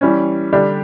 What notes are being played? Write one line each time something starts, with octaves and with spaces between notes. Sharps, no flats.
E3 G3 C#4
D3 G3 D4 G4